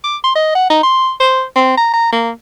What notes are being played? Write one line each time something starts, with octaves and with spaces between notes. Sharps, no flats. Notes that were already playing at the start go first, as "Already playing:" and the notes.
D6
C6
D#5
F#5
D#4
C6
C5
C4
A#5
A#5
A#3